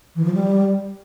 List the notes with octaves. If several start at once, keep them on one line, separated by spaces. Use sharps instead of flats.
E3
F3
G3